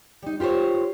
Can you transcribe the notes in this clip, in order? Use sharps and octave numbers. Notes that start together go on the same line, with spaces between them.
G3 D#4
F4 G4 A#4 C5 C#5